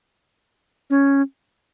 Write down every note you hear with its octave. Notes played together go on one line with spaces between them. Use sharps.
C#4